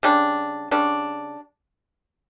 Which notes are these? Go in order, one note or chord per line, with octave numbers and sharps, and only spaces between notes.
C#3 G3 D4
C#3 G3 D4